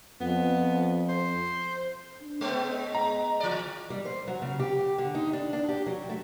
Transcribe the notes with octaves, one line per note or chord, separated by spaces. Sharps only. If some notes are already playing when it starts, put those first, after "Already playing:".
F2 B3
C5
D4
G#3 B3 C#5
D#5
A#5
E3 D5
G3
C5
F#3
C#3
G4
D3
D#4
D4
D4
G4
F#3
A3